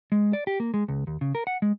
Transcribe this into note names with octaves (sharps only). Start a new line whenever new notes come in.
G#3
D5
G4
A#3
G#3
C#2
D#2
C#3
A#4
F#5
G#3